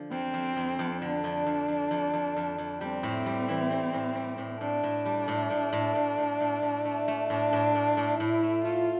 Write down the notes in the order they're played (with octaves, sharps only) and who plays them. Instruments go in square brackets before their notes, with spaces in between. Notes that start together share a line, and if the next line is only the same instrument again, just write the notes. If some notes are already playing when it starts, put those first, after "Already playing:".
Already playing: [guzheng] D3 F3
[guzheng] F2 [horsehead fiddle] C4
[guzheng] F2
F2
F2
[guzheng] D3 [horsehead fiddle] D4
[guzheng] F2
F2
F2
F2
F2
F2
F2
[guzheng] G3 [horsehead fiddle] C4
[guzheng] A2
G3
E3
G3
A2
G3
A2
[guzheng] A2 [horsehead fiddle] D4
[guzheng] A2
G3
A2
A2
A2
A2
A2
A2
A2
A3
A3
[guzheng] A2 [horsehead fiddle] D4
[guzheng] A2
A2
A2
[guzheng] A2 [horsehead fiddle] E4
[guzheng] A3
[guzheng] A3 [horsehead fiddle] F4